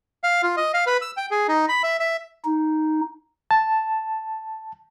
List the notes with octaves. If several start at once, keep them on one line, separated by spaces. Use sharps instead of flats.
F5
F4
D#5
F5
B4
E6
G5
G#4
D#4
B5
E5
E5
D#4
A5